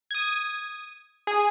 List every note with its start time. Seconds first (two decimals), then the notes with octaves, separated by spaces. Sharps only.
0.11 D#6 G#6
1.27 G#4